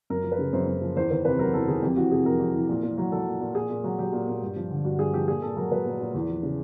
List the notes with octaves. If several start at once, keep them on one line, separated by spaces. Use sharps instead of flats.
F#2 A#4
F3
B4
C#3
F#2 C5
F#2
F3
E2 C5
D#3 B4
C3 B4
F#3 A#4
E2 A4
D#3 G#4
F2 G4
E3 F#4
C3 G#4
F2 A#4
F2
E3
A#2
A#2
F#3
F#3 A4
A#2
A#2
A#2 G#4
A#2
F#3
F#3 G4
A#2
A#2
G2
F3
D3
G2 F#4
G2 G#4
F3 G4
A#2 G#4
A#2 A4
F#3 A#4
F#3 B4
A#2
A#2
E2
F3
C#3